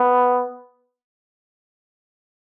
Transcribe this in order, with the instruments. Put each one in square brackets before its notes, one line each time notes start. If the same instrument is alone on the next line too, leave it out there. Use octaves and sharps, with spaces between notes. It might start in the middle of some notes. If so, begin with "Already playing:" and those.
Already playing: [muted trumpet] B3